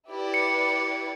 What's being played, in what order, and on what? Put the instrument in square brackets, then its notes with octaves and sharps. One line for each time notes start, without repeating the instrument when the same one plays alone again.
[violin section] E4 G4 B4 D5
[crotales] C#7